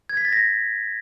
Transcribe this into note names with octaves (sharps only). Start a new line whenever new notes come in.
G#6
B6
A6
A#6